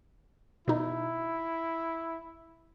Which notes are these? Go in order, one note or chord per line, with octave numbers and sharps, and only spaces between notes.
B2 D#4 E4